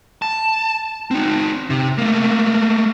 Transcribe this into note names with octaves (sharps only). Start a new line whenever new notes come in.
A5
C4 D#4
C3
A3 A#3